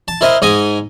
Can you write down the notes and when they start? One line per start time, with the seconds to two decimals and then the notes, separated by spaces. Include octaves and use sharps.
0.08 A5
0.21 E4 A#4 C5 D#5
0.42 G#2 D#5 G#5 A#5 D#6